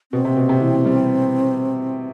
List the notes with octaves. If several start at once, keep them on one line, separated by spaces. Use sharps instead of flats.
B2 C4
C3
B2
C3
E3
G3